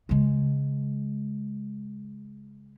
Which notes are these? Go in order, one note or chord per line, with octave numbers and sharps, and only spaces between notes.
C#3 G#3